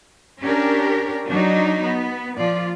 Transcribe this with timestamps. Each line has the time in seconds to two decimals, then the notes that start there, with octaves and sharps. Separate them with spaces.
0.40 C#4 D4 G4 A#4
1.27 F#3 D4 D#4
1.81 B3
2.38 A#2 F3 F4 D5